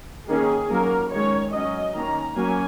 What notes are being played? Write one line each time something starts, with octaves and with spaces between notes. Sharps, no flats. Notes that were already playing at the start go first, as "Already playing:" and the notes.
D#3 A#3 C#4 G#4
F#3 A#3 C#4 A#4
D#3 G#3 C#4 C#5
F#3 C#4 D#5
D#3 A#3 C#4 A#5
F#3 A#3 C#4 G#5